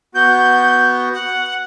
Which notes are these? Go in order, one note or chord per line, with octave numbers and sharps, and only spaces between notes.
B3 F#4 G6
F#5